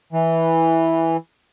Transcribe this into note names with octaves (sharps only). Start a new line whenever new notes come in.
E3